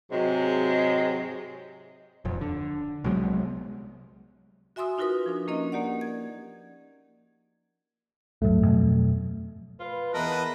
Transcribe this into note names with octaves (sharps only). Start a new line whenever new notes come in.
G#2 C3 F#3 G#3
D#1 F2
D3
C2 F#3 G#3 B3
F#4 E5 G#5 C6 D#6 E6
D#4 F4 F#4 A#4 B4 D#6
F3 D4 D#4
A#3 C#4 D#4 A#4 D#5
A#3 G4 D5 F#5
G#6
D1 G2 F#3 A3
F2 B2
F4 B4
E2 A#4 B4 D#5 A5